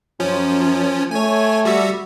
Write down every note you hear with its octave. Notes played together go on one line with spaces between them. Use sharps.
F#2 F3 C#4
A3 C#5 G#5
G3 F#4 E5